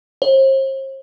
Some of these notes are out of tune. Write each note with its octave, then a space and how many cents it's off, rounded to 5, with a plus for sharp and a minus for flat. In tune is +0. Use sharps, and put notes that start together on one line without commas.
C5 +40